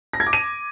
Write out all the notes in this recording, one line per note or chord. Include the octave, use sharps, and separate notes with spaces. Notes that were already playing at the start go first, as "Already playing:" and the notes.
A#6
G#6
D6
D#7